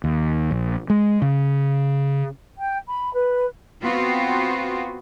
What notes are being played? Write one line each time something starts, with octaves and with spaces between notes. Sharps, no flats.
D#2
A#1
G#3
C#3
G5
B5
B4
B3 C4 F4 F#4